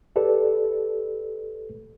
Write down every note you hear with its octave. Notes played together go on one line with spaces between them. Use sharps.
G4 A4 B4 D5